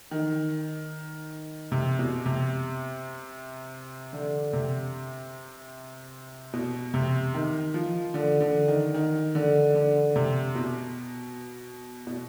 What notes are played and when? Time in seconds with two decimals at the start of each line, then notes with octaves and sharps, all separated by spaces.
0.11 D#3
1.72 C3
1.99 B2
2.26 C3
4.13 D3
4.53 C3
6.53 B2
6.94 C3
7.34 D#3
7.74 F3
8.14 D3
8.41 D3
8.68 D#3
8.94 D#3
9.35 D3
9.75 D3
10.16 C3
10.55 B2
12.07 B2